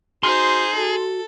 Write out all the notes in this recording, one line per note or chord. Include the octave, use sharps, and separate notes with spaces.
D#4 F#4 G#4 C5 C6 F6
F#4 A4